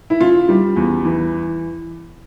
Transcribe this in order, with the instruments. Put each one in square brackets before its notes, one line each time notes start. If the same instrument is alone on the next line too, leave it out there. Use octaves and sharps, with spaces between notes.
[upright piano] E4
C#3 F4
G3
E2
E3